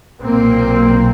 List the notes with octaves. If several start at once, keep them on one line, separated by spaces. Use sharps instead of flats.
B1 A#2 A#3 C4